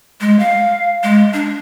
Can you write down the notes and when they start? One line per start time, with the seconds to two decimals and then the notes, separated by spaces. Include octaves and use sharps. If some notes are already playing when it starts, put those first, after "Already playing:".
0.21 G#3
0.39 F5
1.03 G#3
1.33 D4